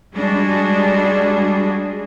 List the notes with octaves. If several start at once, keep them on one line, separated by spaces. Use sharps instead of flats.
G3 G#3 D4 F#4 G#4